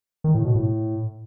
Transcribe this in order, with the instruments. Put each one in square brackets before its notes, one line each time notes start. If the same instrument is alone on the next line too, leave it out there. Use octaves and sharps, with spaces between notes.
[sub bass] D#3
A2
B2
A2